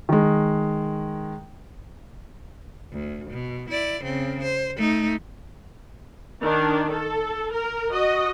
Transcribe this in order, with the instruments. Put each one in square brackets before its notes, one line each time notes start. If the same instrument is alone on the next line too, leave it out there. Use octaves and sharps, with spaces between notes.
[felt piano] D#3 G#3
[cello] D2
B2
E4 D5
C#3 C4
C5
A3 D#4
[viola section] D#3 D4
A4
A#4
F#4 D#5